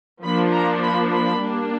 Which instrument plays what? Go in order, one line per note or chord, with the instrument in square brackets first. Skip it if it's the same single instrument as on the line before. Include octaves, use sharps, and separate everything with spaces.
[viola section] F3 A#3 D4 B5
A#5
B5
B5
G3 A#3 D4